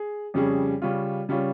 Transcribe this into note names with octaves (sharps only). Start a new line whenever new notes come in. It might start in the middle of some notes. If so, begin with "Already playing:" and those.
Already playing: G#4
F2 C#3 G3 C#4 G#4
C#3 G3 C#4 F4
C#3 G3 C#4 F4